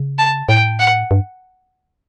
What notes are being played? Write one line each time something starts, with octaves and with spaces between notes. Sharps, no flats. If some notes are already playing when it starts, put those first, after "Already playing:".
Already playing: C#3
A5
A2 G5
F#5
G2